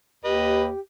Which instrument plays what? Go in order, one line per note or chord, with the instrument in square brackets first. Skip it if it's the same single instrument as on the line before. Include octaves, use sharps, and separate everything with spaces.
[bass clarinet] D#2 [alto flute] G4 [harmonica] B4 D#5